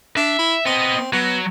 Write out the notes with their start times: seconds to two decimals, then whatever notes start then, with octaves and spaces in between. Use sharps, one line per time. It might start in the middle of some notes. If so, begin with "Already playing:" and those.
0.17 D4 E5
0.39 E4
0.66 B3 C4 D#5
1.13 F#3 B3